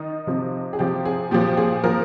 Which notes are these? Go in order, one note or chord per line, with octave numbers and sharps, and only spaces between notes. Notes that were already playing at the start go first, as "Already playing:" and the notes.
Already playing: D#3 D#4
C3 F3
G#4
C3 F3 G4
G#4
A#2 F3 G4
G#4
A#2 F3 A#4